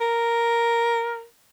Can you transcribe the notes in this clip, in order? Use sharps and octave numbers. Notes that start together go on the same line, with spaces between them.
A#4